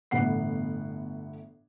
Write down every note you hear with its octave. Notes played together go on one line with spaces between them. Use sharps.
G1 A2 E3 B3 F#5 C7